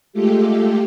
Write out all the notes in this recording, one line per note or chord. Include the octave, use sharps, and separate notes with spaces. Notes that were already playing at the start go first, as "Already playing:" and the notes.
G#3 A3 F4 G4 A4